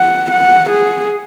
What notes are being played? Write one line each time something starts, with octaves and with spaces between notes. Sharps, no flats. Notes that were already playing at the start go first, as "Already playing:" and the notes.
Already playing: F#5
F#5
G#4